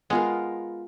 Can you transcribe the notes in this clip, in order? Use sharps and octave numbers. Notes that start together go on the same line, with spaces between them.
G#3 B3 F4 A#4